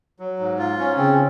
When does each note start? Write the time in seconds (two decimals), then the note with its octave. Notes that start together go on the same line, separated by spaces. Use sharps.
0.19 F#3
0.40 G#2
0.58 F4
0.79 C#4
0.97 C#3 C4